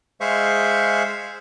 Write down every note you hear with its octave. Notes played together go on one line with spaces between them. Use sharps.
G#3 G#4 C5 E5 F5 C#6